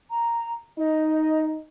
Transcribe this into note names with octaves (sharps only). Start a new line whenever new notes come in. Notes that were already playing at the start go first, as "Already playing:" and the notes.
A#5
D#4 D#5